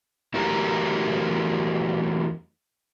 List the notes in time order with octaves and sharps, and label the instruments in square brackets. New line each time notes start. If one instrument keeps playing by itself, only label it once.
[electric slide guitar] E2 F#3 A3 G4 A#4 A#5